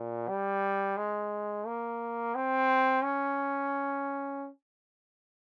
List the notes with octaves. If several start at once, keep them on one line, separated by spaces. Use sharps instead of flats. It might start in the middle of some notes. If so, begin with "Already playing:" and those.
Already playing: A#2
G3
G#3
A#3
C4
C#4